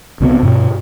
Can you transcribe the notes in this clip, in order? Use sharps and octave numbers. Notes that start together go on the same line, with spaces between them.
C2 C3 F#3 B3
G2 B2